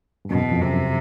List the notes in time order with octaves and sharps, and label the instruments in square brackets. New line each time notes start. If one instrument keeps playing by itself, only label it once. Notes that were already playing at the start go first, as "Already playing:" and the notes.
[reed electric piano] G2
[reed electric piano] F#2 [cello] B2
[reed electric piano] E2
F2
[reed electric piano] F#2 [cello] C3